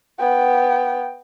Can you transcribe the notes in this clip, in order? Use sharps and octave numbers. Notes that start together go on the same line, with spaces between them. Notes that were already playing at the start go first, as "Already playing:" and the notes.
B3 G5